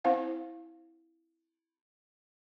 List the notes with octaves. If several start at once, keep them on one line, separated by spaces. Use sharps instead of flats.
C4 E4 C5 F5 F#5